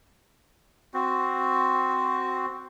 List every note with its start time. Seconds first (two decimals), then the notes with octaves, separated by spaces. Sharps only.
0.94 C4 F#4